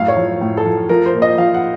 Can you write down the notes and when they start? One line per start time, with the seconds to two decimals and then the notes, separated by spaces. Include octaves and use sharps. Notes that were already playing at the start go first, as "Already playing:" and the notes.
Already playing: F#2 A2 F5
0.08 C#5
0.17 F3
0.41 A2
0.57 A4
0.65 F3
0.89 F3 A#4
1.06 C5
1.14 A#2
1.22 D#5
1.38 F3 F5
1.54 F#5